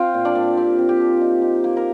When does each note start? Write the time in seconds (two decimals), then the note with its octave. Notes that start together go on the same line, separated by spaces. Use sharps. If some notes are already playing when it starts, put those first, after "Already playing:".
Already playing: C4 F4 F5 G5
0.14 A#2
0.25 D4 D5
0.35 A#2
0.57 C4 G4
0.79 C4
0.89 G4
1.00 F3
1.21 D#4
1.42 D#4
1.64 A#3
1.77 A#4